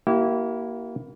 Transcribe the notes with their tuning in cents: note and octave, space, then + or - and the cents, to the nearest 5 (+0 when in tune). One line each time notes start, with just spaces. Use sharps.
A#3 +10 E4 +0 G4 -40